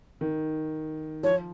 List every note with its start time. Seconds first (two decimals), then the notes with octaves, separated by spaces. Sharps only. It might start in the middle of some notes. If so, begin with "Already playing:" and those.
0.21 D#3
1.23 F3 C#5